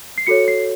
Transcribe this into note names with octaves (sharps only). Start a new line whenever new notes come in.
C7
F#4 A4 C#5 C#7
C7